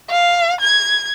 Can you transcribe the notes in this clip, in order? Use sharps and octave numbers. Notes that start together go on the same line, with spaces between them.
F5
G#6